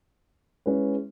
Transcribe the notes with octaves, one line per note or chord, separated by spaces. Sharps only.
G#3 C#4 E4 B4